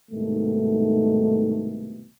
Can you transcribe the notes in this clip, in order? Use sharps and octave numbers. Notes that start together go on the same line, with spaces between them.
C2 G#2 B2 D#3 A3